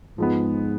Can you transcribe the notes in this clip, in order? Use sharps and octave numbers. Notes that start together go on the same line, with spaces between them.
G#2 F3 G#3 B3